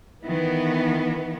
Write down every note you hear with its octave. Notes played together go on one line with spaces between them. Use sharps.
D#3 E3 B3